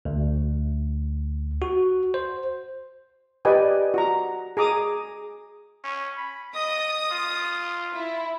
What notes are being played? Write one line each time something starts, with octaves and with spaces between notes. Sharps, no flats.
D2
F#4
C5
G4 B4 D5 D#5 G5 G#5
F#4 A#5
G#4 A#5 D6 D#6
C#4
B5
D#5 D#6
F4
E4